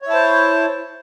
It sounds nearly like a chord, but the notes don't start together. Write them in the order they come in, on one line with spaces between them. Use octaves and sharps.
C#5 E4 A5 C5